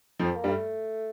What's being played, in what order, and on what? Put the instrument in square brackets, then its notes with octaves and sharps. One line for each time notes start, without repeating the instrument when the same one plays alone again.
[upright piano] F2 F3
[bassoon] C4
A#3
[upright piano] G2 G3
[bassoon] A#3
A3